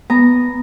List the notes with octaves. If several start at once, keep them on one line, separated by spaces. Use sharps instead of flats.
B3 A#5